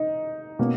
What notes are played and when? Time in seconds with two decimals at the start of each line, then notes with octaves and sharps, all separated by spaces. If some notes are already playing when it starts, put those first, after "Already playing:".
Already playing: D#4
0.59 B2 A#3 C#4